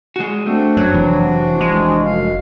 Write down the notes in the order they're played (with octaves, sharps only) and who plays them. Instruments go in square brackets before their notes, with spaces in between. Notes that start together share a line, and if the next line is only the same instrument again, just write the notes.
[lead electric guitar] G#3 F#4
[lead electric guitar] A3 [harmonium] C4 D4 F#4
[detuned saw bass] F#2 [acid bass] F#3
[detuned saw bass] F1 [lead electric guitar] E3
[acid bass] G#3
[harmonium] F#2 F5